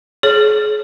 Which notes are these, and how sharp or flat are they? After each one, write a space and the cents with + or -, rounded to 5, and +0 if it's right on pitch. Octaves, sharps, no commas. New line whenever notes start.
G#4 +30 C#5 +0